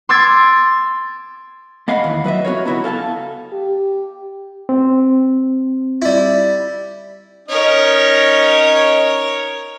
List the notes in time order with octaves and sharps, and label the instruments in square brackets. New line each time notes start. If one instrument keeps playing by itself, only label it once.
[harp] C6 D6 E6 G#6 A6
[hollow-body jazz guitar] A#3 D#5 F5 F#5 B5
D#2 E3
F#3 B4 D#5 E5
B3 F#4 A#4 C#5
C#2 B3 E4 F#4 A#5
A4 F5 G#5 A5
[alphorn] G4
[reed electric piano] C4
[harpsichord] G3 E4
[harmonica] C#4 D#4 D#5 [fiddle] A#4 C#5